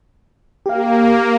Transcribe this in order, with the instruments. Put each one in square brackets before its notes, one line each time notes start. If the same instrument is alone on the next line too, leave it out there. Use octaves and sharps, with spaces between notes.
[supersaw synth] A#3 [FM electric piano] G4 F5